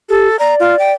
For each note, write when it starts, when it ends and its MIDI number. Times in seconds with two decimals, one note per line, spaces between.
0.09 0.28 67
0.09 0.39 69
0.39 0.94 74
0.39 0.55 82
0.60 0.78 65
0.79 0.91 79